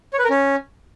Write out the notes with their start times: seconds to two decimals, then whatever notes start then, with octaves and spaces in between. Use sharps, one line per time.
0.13 C#5
0.19 B4
0.24 A#4
0.30 C#4